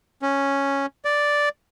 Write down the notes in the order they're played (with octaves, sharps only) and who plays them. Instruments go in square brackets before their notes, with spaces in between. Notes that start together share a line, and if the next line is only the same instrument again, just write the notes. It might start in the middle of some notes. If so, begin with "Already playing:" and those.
[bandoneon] C#4
D5